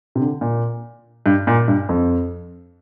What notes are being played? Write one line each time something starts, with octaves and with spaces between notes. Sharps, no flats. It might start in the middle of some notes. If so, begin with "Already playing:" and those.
C3
D3
A#2
G2
A#2
G2
F2